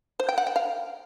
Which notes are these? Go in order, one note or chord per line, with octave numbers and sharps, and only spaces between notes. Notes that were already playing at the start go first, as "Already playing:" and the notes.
C5
G5
F#5
G5
F5